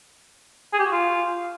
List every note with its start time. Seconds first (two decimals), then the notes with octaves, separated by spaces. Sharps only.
0.73 G#4
0.79 G4
0.85 F#4
0.92 F4